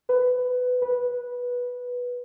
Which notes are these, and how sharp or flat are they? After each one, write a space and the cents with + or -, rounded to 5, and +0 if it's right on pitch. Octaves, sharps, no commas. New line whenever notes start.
B4 +20
B4 -10